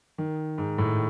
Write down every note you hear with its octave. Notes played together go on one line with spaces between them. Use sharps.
D#3
G#2
A2